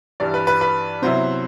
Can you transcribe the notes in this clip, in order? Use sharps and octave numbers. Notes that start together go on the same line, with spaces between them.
G2 E3 G3 D5
B4
B4
B4
C3 F#3 B3 E4 C5